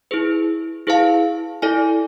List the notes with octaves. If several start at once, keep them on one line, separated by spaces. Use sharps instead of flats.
E4 G#4 B4
E4 G#4 B4 F5 A5
E4 A4 D5 G#5